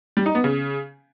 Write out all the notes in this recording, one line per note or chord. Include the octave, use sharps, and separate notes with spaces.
G3
D#4
B3
C#3